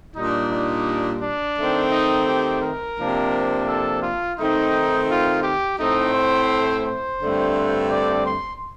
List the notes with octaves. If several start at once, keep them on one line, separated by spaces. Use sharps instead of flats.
A#2 G3 D4 D#4
D#4
D4
D#3 A3 C4
D#4
G4
A#4
C3 F3 A#3 D4
A4
F4
D#3 A3 C4 D#4
F4
G4
A2 A3 C4 D#4
C5
C5
G2 D3 A3 C4
D5
C6